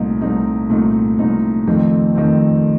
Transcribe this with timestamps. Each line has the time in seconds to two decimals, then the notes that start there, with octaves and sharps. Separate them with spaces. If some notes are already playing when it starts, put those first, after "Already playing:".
Already playing: C2 A#2 A3 C4 D#4
0.21 C2 A#2 A3 C4 D#4
0.70 C2 A#2 A3 C4 D#4
1.19 C2 A#2 A3 C4 D#4
1.67 F2 D#3 A3 C4
2.15 F2 D#3 A3 C4